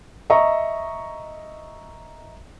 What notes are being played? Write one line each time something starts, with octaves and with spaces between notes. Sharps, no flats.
D#5 E5 A#5 C#6